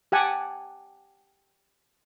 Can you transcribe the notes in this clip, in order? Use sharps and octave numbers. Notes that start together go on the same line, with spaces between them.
G4 F#5 G#5 A5